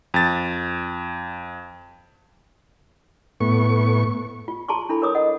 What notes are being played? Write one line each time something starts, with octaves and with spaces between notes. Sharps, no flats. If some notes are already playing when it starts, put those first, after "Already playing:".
F2 A6
A2 B3 C#6
F4
G#4 A5 A#5 C6 C#6
D4 E4 A4 B5
A#4 C#5 D6 D#6
D#5 F#5